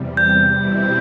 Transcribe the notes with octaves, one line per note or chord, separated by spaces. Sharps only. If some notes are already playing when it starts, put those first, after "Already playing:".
Already playing: E2 C3 G3
G6
B2 G3 C4 E4